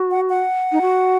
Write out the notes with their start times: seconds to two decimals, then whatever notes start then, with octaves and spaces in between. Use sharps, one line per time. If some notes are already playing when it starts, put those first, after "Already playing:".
Already playing: F#4
0.11 F#5
0.29 F#5
0.72 D#4
0.81 F#4